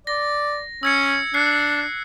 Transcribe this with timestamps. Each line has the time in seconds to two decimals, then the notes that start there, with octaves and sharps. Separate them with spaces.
0.07 D5 A#6
0.83 C#4 E6 G#6 C#7
1.34 D4 F#6 C7 C#7